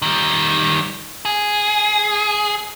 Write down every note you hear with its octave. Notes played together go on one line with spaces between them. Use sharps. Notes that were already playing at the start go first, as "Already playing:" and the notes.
D#3 G3
G#4